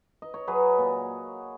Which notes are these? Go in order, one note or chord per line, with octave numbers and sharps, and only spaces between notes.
D#5
C#5
F#3 G#4 B4
A#2